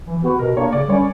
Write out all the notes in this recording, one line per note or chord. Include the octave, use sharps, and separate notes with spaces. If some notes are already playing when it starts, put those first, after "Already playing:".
E3
B3 F#4 G4 B4
B2 A#4
A#3 D4 C#5
C#3 D5
G3 C#4 C#5